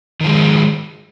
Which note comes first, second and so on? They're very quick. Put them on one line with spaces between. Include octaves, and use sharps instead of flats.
D#3 F3 G#3